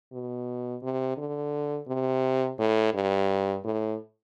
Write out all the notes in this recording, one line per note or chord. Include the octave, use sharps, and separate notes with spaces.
B2
C3
D3
C3
A2
G2
A2